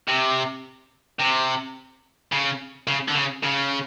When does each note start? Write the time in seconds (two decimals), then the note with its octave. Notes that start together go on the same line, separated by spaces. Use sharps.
0.08 C3
1.20 C3
2.32 C#3
2.88 C#3
3.09 D3
3.15 C#3
3.43 C#3